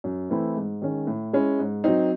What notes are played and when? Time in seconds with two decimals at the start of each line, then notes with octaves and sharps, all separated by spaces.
0.04 F#2
0.30 E3 A3 C4 E4
0.56 G#2
0.82 D#3 G#3 C#4
1.07 A2
1.33 G#3 C#4 E4
1.59 G#2
1.84 F#3 C4 D#4